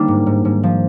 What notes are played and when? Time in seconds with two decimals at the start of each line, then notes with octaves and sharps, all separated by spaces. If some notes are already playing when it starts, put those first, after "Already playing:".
Already playing: D#3 G3 A#3 C4 D4
0.08 G#2
0.26 G#2
0.45 G#2
0.63 F3